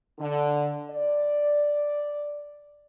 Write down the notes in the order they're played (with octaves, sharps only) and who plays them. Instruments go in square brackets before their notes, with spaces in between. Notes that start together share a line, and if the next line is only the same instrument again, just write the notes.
[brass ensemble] D3
D5